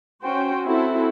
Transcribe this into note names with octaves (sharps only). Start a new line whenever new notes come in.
C#4 F#4 C5 G5
C4 E4 F#4 A4